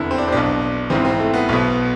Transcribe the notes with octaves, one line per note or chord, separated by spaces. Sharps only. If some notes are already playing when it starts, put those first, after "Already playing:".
Already playing: F1 E2 D3 E4
C4
D4
C4
B1 B2 D4
G#1 G#2 E3 C4
C4
A3
B3
B1 B2